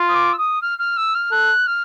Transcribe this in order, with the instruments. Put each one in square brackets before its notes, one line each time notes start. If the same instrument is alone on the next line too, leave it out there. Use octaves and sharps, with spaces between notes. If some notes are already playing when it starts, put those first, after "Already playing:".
Already playing: [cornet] F4
[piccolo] D#6
D6
E6
D#6
F6
F6
E6
F6
[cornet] A4 [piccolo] F#6
[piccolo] F6